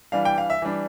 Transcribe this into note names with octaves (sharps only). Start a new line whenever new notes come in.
E3 G3 D4 F5
G5
F5
E5
E3 G3 D4